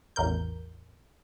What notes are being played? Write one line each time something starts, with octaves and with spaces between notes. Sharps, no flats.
A1 E2 A#4 G6